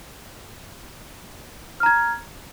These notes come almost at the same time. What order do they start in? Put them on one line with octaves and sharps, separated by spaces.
F6 A#5 G#6